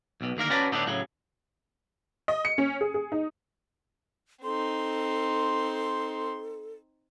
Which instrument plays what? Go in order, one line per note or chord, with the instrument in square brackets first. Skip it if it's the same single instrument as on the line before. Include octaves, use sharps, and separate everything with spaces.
[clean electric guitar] B1 B2
D2 D#3 A#3 A#4
C#4 F#4 B4 D5 A5 A#5
A2 D3 B3 D4 D#4
A2 C#3 F#3
[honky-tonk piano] D#5
C#7
C#4
G#4
G#4
D#4
[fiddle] C4 D#4 [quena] A4 [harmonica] C6